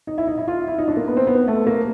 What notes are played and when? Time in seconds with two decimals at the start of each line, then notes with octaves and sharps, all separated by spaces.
0.07 D#4
0.18 E4
0.27 D#4
0.38 E4
0.48 F4
0.68 E4
0.78 D#4
0.88 D4
0.97 A#3
1.08 B3
1.17 C4
1.27 B3
1.48 A3
1.67 A#3